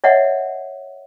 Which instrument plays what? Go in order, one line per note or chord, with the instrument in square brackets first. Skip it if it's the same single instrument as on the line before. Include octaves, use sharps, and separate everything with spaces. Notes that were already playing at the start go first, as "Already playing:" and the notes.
[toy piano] C#5 D#5 E5 F#5